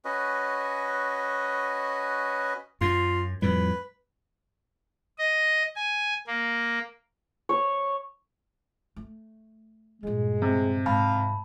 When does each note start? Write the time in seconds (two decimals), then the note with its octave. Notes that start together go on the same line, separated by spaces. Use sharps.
0.05 C#4 F#4 B4 D#5
2.81 F#2 F4
3.42 F2 A2 G3 B4
5.18 D#5
5.76 G#5
6.27 A#3
7.49 C#5
8.96 A3
10.03 G2 A#2 G#3
10.42 C3
10.86 G#2 F5 A5 B5